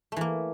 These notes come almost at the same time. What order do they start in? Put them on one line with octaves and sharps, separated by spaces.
A3 E3 A#3